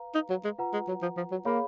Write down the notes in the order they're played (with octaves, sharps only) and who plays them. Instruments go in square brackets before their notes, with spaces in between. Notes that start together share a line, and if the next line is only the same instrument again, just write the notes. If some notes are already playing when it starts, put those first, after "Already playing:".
Already playing: [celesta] B4 F5 A#5
[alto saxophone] D#4
F#3
G#3
[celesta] F4 B4 F#5 A#5
[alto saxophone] G#3
F#3
F3
F3
F#3
[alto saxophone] A#3 [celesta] G#4 C#5 F5 B5